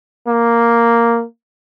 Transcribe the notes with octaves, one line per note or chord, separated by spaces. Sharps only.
A#3